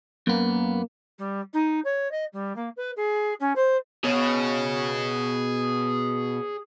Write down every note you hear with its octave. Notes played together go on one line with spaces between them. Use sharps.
F#2 A#3 B3
G3
D#4
C#5
D#5
G3
A#3
B4
G#4
C#4
C5
B2 G#4 C#5